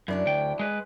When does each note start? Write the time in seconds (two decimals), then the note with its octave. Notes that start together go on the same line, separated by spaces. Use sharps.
0.08 F#2 F#3 D4 E4
0.26 D2 G5
0.59 G#3 B4